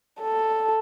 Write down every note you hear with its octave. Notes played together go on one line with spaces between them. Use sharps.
A4